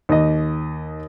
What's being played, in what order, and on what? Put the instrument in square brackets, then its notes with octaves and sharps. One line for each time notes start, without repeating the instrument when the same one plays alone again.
[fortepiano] D#2 D#5